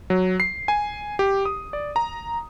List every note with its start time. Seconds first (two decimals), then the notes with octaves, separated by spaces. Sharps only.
0.10 F#3
0.40 C7
0.68 G#5
1.19 G4
1.45 D#6
1.73 D5
1.96 A#5